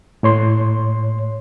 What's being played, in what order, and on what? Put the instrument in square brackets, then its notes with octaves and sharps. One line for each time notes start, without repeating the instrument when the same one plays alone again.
[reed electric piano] A2 C#5 C6